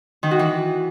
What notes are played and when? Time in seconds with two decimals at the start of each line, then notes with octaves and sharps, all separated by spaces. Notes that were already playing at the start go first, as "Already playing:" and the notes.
0.23 D#3
0.31 F#4
0.39 E3